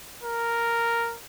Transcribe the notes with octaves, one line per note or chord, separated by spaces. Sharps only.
A#4